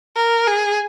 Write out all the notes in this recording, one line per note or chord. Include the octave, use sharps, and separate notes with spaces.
A#4
G#4